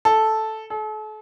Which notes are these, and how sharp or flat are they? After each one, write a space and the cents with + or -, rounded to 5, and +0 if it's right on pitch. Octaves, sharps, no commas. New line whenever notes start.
A4 -5
A4 -40